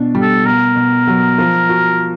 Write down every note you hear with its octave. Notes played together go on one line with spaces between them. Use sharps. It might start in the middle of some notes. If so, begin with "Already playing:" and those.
Already playing: B2 D4
G3
A4
B2 A#4
B2
F#3
F3
F#4